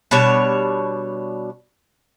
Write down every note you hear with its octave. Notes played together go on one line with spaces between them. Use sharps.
B2 G3 D4 C#5